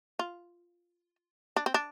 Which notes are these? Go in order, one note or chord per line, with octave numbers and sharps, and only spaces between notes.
F4
D4
C4
D4